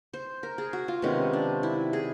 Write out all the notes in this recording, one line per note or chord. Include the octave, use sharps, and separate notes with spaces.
C5
A#4
G#4
F#4
F4
C3 D#3 G#3 B3 C#4
D4
E4
G#4